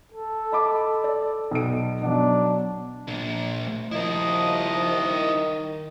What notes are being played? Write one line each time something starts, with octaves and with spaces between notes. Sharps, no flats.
A4
D#5 B5 D6
D5
B1 D7
B2 F#3 D4
A#2 D4
D#2 F3 E4 A#4 D#5
D#3